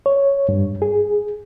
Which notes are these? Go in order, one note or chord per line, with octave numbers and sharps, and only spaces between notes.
C#5
G2
G#4